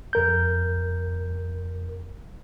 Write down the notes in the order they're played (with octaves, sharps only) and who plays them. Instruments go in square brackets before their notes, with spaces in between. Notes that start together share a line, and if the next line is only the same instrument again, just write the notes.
[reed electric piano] F2 A#4 G6